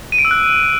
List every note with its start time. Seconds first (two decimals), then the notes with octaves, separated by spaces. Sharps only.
0.12 D#7
0.18 D7
0.25 E6
0.31 F#6